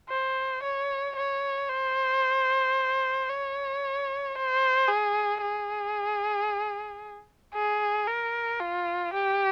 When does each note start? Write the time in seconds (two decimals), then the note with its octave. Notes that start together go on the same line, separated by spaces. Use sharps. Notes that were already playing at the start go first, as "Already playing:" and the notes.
0.09 C5
0.63 C#5
1.16 C#5
1.70 C5
3.29 C#5
4.36 C5
4.89 G#4
5.42 G#4
7.54 G#4
8.07 A#4
8.60 F4
9.13 G4